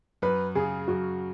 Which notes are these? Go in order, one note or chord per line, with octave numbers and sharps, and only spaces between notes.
F#2 B4
C#3 G#4
F#2 F#4